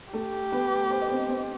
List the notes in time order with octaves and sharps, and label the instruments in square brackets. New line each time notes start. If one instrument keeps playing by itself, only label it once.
[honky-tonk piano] A3 A4 [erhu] G4
[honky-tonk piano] B3 B4
C5
D#5
C4 C5
C4 C5